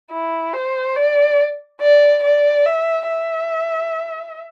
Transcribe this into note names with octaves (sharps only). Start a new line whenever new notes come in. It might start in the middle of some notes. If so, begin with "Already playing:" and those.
E4
C5
D5
D5
D5
E5
E5